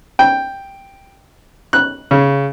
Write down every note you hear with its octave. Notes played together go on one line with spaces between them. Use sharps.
G5
F#6
C#3